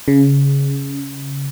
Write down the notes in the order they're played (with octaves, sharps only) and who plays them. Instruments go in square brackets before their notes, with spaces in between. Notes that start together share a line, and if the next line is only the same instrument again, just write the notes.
[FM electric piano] C#3